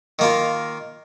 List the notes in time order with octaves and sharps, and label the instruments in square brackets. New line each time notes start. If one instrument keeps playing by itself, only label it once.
[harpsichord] D#3 A#3 F4